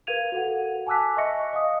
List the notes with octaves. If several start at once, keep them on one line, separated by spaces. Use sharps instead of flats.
A#4 B4 F5 G#6 D#7 F7
F#4 A4 F#5
G#5 A5 D6 E6 F#6 B6
D#5 E5 C#6 A#6 C#7
D#5 F5 D#6